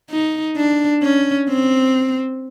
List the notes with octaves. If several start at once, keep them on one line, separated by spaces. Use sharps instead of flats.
D#4
D4
C#4
C4